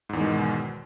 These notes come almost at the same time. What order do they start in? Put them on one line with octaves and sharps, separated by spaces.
G#2 E2 D#3 G#3 B2